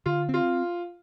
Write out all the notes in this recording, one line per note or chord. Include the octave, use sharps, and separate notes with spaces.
D3 F4
C4 F4